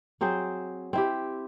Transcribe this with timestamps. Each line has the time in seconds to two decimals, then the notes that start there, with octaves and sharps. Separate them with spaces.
0.21 F#3 C4 G#4 C5
0.93 C4 E4 G4